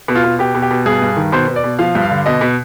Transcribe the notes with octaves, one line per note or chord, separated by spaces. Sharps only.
B2
F4
B2
B2 G4
B2
G4
B2
G2 G#4
G2
D#3
B2 C5
B2
D5
B2
F3 F5
G2
F5
D3
B2 D#5
B2